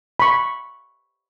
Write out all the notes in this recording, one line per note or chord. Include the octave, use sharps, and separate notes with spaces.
B5 C#6